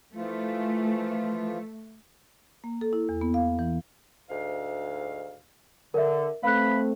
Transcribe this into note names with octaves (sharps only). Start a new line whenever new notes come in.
E3 F3 A3 F4
A#3
A4
E4
E2
B3
F5
E3
D2 G#2 F5
D3 A#4 E5
A3 C4 B4 F5 B5 F#6